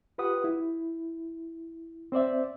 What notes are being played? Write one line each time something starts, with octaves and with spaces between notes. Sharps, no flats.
F4 G4 B4 F#5 D#6
E4
C4 C5 D5 E5